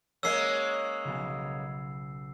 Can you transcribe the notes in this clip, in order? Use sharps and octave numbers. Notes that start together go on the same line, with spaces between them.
G#3 A#3 C#4 E6 C7
B1 C#3